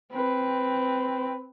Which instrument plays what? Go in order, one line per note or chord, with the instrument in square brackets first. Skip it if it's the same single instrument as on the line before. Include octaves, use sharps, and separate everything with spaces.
[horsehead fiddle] C4 B4